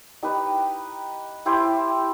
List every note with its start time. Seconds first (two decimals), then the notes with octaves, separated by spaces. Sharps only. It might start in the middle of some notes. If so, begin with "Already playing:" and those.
0.23 D#4 G4 B4
1.46 E4 G4 C5